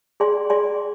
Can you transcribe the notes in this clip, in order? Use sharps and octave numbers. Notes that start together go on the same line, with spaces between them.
G#4 D5 G#5 C6
G#4 D5 G#5 C6